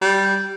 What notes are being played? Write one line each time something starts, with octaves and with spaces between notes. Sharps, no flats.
G3